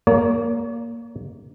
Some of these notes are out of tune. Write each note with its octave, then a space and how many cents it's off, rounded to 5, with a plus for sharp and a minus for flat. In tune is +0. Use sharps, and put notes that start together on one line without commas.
A#3 +5 C#5 +45